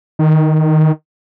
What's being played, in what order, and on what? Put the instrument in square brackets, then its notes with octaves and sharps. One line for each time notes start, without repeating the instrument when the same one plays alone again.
[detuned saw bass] D#3